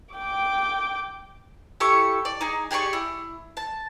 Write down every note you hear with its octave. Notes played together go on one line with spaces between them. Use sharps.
G5 D6
E4 G4 A4 C#6
D5
D#4 G#4
G4 G#4 D5 C#6
E4
A5